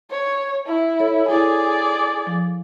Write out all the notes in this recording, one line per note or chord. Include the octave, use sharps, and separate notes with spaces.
C#5
E4
A4 C#5
E4 G#4 A4 D5
F3